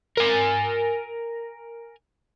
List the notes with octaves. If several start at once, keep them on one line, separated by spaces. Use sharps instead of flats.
A#4 G#5